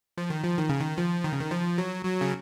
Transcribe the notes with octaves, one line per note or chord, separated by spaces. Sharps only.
F3
D#3
F3
D#3
C#3
D#3
F3
D#3
C#3
D#3
F3
F#3
F#3
C#3